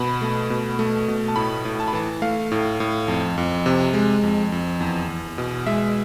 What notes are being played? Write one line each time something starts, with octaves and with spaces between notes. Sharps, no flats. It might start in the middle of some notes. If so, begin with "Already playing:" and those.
Already playing: B2 B5
A3
B2
A3
B2
A5
A2 B5
A2
A5
B5
E3 A5
A3 F5
A2
A2
F2
F2
C3
G#3
F2
F2
E2
E2
B2
G#3 E5